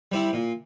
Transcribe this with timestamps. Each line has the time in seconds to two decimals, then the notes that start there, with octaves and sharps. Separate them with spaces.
0.12 G3 C4 E4
0.33 A#2